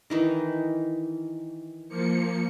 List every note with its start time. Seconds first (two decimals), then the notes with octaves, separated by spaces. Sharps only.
0.10 D#3 E3 D#4
1.88 F3 A#3 C#7